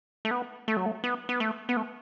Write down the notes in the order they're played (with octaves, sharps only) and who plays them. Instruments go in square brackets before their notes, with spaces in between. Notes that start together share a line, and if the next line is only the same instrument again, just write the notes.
[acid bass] A3
B3
A3
F#3
A3
B3
B3
A3
B3
A3